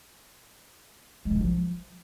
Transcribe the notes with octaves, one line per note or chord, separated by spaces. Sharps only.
G#3
D#3
D4
F3